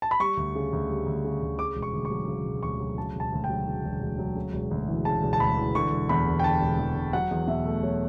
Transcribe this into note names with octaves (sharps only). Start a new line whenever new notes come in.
A5
B5
G3 C#6
D2
C#3
D2
G3
D2
C#3
D2
C#3 D6
E1
C#6
D2
C#6
F#3
C#3
E1
D2 C#6
F#3
C#3 A5
E1 A5
D2
G5
F#3
C#3
E1
D2
F#3
C#3
E1
D2
E3
C#3 A5
E1
A5
D2 B5
E3
D3 C#6
E1
E2 B5
E1
G5
D3 A5
E1
E2
E1
F#3 F#5
E2
B2 E5
A3
F#3 C#5